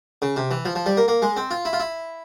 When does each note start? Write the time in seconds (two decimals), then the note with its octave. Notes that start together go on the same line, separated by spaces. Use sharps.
0.22 C#3
0.36 C3
0.51 E3
0.65 F3
0.75 F3
0.86 G3
0.97 A#3
1.08 A#3
1.22 G#3
1.37 C4
1.51 F4
1.65 E4
1.73 F4
1.80 E4